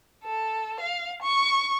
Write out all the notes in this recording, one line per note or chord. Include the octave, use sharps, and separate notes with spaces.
A4
F5
C#6